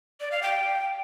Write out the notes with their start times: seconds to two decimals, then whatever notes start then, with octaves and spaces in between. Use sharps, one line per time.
0.21 D5
0.32 F5
0.43 G5